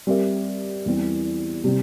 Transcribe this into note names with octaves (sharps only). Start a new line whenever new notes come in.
G3 C4 G4 A#4 E5
E2 E3 G3 C4
C3 G3 C4